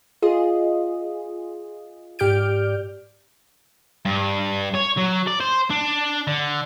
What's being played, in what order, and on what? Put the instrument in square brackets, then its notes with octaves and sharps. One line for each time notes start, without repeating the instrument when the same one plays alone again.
[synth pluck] F4 G#4 D#5
G#2 G4 D5 F6 G6 D7
[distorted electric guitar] G2
C#5
F#3
D5
C5
D4
D3